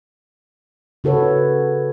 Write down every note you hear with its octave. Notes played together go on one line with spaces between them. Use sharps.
C#3 F#4 A4 B4 C#5